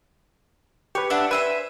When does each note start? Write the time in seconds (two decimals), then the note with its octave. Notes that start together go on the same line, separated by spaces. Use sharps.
0.95 G4 B4 C#5
1.10 D4 E5 F#5
1.31 B4 C5 E5 G#5